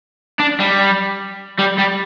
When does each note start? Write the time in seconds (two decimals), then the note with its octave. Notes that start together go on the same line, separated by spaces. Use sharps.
0.40 D4
0.60 G3
1.59 G3
1.79 G3